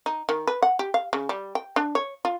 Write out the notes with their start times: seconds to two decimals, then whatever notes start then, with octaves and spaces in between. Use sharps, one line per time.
0.06 D#4
0.29 D#3
0.47 B4
0.62 F#5
0.79 G4
0.94 F5
1.13 C#3
1.29 G3
1.55 G5
1.76 D4
1.95 C#5
2.25 F4